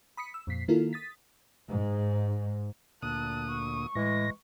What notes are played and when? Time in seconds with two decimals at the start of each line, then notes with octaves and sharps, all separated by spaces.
0.17 B5 D#6 B6 C#7
0.34 E6
0.47 F2 A#2 B6 C7
0.68 D#3 A#3 E4 F4 A4 A#4
0.93 D#6 A6 B6
1.69 G#2
3.03 D2 A#2 A5 D#6 F#6
3.51 C#6
3.95 A2 E3 G#3 A#6